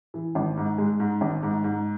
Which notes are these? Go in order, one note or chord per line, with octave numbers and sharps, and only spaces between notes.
E3
G#1
G#2
G#3
G#2
G#1
G#2
G#2